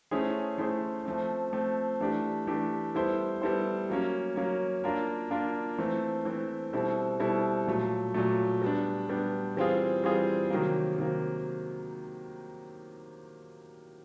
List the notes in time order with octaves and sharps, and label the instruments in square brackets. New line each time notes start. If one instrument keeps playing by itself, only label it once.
[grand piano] A3 C#4 E4 G#4 C5
A3 C#4 E4 G#4 C5
F3 A3 C4
F3 A3 C4
E3 A3 D4 G4
E3 A3 D4 G4
G3 B3 E4 A4 C5
G3 B3 E4 A4 C5
F#3 A#3 C#4
F#3 A#3 C#4
A#3 D4 F4 A#4
A#3 D4 F4 A#4
E3 A3 C4
E3 A3 C4
B2 G3 C4 E4 A4
B2 G3 C4 E4 A4
A#2 F#3 A3
A#2 F#3 A3
G3 B3 D4
G3 B3 D4
E3 G3 C4 F4 G#4
E3 G3 C4 F4 G#4
C3 D#3 F#3 A#3
C3 D#3 F#3 A#3